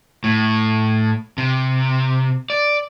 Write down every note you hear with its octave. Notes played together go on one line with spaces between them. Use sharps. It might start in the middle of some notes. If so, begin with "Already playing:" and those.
A2
C3
D5